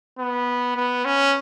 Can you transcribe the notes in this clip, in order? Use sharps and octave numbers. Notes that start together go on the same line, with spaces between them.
B3
B3
C#4